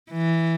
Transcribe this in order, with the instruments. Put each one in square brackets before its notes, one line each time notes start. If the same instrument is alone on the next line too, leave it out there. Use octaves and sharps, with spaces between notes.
[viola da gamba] E3